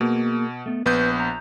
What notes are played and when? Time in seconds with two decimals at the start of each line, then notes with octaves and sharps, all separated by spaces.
0.01 B2 A#3 G#4 A#4
0.66 A3 B3
0.86 A#1 B3 B4 G6
1.20 A#5